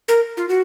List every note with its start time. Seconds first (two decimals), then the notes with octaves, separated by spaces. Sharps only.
0.08 A#4
0.37 F4
0.49 F#4